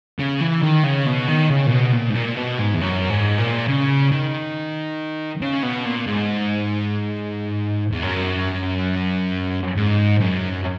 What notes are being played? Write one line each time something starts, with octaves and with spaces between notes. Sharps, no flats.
C#3
E3
D#3
C#3
B2
D#3
C#3
A#2
B2
A#2
G#2
A#2
B2
G#2
E2
F#2
G#2
A#2
C#3
D#3
C#3
B2
A#2
G#2
E2
F#2
G#2
F#2